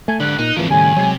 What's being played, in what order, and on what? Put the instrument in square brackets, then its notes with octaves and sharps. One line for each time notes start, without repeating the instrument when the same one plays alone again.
[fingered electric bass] A3 [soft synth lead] G#5
[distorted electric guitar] G#2 G4 [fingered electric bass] D3 [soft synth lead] F#6
[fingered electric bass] A#2 [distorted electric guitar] D#4
[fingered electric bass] G#2 E3 F3 [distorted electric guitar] C4 A#4
[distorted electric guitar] D#2 [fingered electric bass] A2 C#3 G3 [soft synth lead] G#5
[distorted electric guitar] C3 [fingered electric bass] F#3 G#3